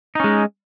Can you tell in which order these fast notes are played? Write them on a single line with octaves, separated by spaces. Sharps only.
D#4 C#4 G#3